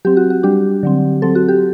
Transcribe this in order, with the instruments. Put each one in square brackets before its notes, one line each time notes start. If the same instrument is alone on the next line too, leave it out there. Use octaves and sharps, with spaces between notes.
[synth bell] F#3 C4 G4
F#4
F#4
G3 D4 G4
D3 F#3 C4
F#3 C4 A4
F#4
G4